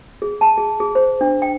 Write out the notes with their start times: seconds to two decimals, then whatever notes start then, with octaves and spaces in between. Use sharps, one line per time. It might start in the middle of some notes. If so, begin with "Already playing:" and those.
0.22 G#4
0.41 A5
0.58 G#4
0.80 G#4
0.95 C5
1.21 D4
1.42 G5